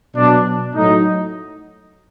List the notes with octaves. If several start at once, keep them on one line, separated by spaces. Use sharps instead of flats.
B2 F#3 D4
A2 F#3 D#4